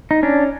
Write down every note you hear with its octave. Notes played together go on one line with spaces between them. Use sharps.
D#4
C#4 D4